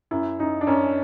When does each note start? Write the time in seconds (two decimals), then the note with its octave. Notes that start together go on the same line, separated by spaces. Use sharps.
0.11 F#2 E4
0.39 F#2 D#4
0.61 D4
0.67 F#2 C#4